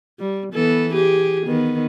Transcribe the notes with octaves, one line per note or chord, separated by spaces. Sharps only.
G3
E3 B3 A4
G4 G#4
D#3 B3